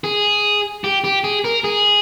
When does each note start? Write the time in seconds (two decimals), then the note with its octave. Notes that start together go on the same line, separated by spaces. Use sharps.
0.04 G#4
0.84 G4
1.04 G4
1.24 G#4
1.44 A#4
1.64 G#4